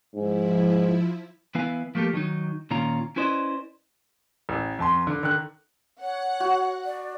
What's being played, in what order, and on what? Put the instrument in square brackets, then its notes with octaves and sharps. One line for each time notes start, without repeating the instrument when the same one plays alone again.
[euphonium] G#2 [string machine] F3 E4
[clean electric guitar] E3 B3 E4 B4 F5 G#5
F3 A3 A#3 G4 A4
D#3 F#3 D#4
A#2 D#3 C#4 F4 A#5
C#4 E4 B4 C5 D5 D#5
[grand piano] A1
F2 A5 C6
D3
D3 D#3 F#6
[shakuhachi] C#5 [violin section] F#5
[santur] F#4
[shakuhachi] D5